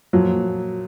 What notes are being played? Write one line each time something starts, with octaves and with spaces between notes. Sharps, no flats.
A#2 F3 F#3